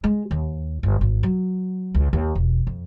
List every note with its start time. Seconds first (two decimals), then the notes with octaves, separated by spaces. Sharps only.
0.04 G#3
0.31 D#2
0.83 G1
1.01 G#1
1.23 F#3
1.94 C#2
2.13 D#2
2.35 E1
2.67 F2